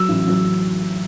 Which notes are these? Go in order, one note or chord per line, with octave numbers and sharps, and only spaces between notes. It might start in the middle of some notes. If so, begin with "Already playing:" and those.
Already playing: F#3 E6
A1
F#3